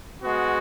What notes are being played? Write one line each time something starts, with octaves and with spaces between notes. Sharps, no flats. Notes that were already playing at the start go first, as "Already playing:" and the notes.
G#3 B3 F#4